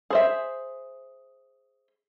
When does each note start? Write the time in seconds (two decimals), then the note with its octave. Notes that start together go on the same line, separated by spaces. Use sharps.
0.10 G#4 C5 E5